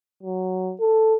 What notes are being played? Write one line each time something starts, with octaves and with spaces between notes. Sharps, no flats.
F#3
A4